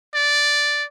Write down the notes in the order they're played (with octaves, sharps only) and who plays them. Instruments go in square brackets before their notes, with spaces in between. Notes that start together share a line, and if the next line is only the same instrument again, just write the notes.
[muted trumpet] D5